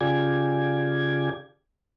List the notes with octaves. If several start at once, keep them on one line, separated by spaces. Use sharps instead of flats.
C#3 F4 G4 G#4 D5 G#6